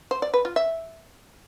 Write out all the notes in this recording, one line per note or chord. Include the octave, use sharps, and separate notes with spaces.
C5
D5
B4
F4
E5